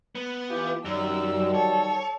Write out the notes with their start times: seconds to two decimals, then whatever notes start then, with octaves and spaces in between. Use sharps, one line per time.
0.15 B3
0.50 E3 F4 G4
0.85 F#2 D#3 F#3 G3 E6
1.55 A4 C#5